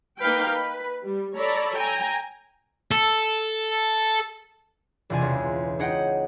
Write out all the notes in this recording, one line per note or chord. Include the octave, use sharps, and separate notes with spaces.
A#3 D#4 B4 F5 G5
B4
G3
A4 C#5 D5 A#5 B5
G5 G#5 A#5
A4
E1 E2 C3 F4 D5 G#5
C#2
D#4 G#4 C#5 D#5 F#5 G5